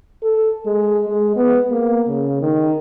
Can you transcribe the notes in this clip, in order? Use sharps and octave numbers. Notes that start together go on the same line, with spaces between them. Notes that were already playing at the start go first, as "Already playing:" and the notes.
A4
G#3
G#3
B3
A#3
C#3
D#3